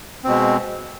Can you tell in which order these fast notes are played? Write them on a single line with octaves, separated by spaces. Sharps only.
C4 B2 G#3